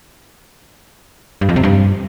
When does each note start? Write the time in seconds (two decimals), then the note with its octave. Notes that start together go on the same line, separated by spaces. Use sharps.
1.41 G2
1.49 F2
1.56 C3
1.63 G2